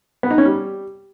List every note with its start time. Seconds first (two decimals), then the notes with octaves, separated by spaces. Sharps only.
0.23 B3
0.31 D#4
0.38 C#4
0.45 G3